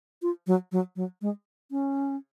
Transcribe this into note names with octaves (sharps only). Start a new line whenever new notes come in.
F4
F#3
F#3
F#3
G#3
C#4